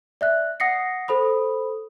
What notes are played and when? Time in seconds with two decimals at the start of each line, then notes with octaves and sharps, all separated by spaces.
0.21 D5 E5 F#6
0.60 F#5 D#6 A#6 C7 C#7
1.08 A4 C5 B5 D#6